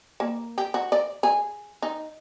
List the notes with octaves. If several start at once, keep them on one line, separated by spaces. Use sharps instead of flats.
A#3
G4
F#4
D5
G#4
D#4